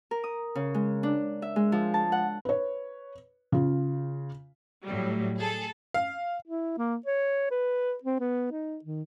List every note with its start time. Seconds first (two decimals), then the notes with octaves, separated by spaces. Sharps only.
0.11 A#4
0.24 D#6
0.55 C#3
0.74 G#3
1.03 D4
1.42 E5
1.56 G#3
1.72 F3
1.94 A5
2.12 F#5
2.45 B4 C#5
3.52 C#3 F4
4.85 A2 F#3 G3
5.37 G#4 A4 A5
5.94 F5
6.46 E4
6.78 A#3
7.06 C#5
7.51 B4
8.03 C4
8.20 B3
8.51 D#4
8.84 D#3